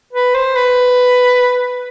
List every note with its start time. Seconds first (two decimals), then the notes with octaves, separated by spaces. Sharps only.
0.13 B4
0.34 C5
0.56 B4